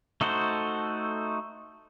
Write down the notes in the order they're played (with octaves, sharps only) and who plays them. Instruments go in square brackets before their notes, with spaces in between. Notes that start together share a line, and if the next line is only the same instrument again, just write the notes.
[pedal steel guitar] A3 D#4 F#4 A4 C5